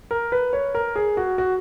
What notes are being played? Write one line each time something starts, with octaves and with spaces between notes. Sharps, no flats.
A#4
B4
C#5
A#4
G#4
F#4
F#4